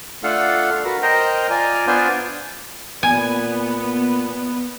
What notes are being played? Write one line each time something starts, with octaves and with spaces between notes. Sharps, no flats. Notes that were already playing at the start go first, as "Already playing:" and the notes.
A3 D4 F4 A4 F5 F#5
F#4 A#4 B4
A#4 C5 D#5 G5 A#5
F4 D5 G#5 A#5
B3 D4 F4 C5 D5 G#5
A#2 B3 G#5